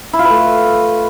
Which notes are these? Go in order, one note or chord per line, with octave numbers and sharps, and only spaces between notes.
E4
F4
B4
A3